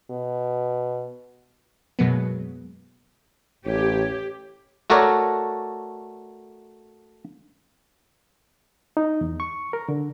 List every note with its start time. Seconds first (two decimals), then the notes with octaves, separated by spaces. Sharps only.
0.11 B2
1.99 F#2 B2 F#3 G#3 A#3 B3
3.66 A1 G4 C#5
4.90 A3 F#4 A4 A#4 C#5 D5
8.97 D#4
9.21 E2
9.40 C#6
9.73 A#4
9.89 D3